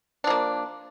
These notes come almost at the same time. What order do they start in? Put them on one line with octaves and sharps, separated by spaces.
D4 F3 A#3